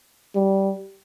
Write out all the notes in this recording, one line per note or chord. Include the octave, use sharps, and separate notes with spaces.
G3